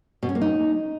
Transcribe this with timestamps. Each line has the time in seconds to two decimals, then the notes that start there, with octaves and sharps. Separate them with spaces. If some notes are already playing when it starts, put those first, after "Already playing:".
0.23 B2
0.29 C#4
0.35 A#3
0.41 D#4